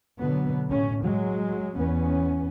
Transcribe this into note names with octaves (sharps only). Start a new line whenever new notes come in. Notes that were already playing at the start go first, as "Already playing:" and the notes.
B2 D3 F#3 B3
A2 C#4
F#3 G#3
E2 B3 C#4